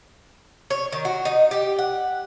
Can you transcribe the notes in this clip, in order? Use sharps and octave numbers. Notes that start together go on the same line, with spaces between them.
C#5
D#3
F#4
D#4
G4
F#5